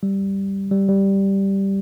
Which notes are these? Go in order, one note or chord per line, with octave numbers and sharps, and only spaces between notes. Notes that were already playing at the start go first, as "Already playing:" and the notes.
G3
G3
G3